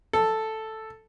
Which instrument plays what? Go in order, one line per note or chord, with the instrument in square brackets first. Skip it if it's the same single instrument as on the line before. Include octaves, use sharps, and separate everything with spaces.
[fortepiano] A4